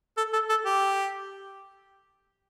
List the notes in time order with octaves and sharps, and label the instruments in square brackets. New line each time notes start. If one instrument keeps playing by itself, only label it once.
[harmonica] A4
A4
A4
G4